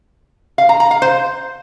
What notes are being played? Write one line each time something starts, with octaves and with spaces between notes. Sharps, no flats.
F5
A#5
A#5
F5
C5